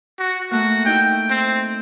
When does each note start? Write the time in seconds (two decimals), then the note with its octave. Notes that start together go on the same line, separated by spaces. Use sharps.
0.19 F#4
0.51 A3 A#3 F#4
0.86 D#4 E4 G5
1.30 C4